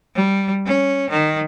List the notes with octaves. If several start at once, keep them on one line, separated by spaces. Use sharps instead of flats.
G3
C#4
D#3